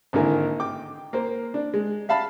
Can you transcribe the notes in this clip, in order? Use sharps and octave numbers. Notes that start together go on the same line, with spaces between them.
G#1 D3 A#3 E4 A#4 G#5
G5 D6
A#3 C5
D4
G#3
E5 F5 A5 B5